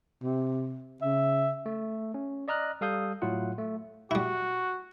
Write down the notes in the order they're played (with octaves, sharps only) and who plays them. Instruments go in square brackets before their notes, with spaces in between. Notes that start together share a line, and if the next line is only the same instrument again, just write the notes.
[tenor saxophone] C3
[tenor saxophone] C#3 [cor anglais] E5
[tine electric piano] A3
C#4
D5 D#5 A#5 F6 F#6
G3 A4 F5 D#6 G6
A2 F#3 E4 F4 F#5
A3
[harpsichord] G3 E4 [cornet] F#4